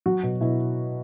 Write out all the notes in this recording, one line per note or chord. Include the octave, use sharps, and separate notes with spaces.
F#3 F#4
B2
B2 E4